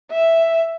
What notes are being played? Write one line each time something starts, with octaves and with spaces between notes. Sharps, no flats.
E5